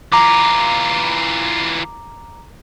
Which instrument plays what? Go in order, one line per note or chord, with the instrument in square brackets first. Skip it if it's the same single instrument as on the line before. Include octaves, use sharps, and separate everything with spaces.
[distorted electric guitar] E3 F4 [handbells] A#5 D6